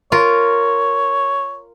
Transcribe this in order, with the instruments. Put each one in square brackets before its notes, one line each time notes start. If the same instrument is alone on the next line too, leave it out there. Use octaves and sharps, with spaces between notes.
[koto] F4 A#4 [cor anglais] C#5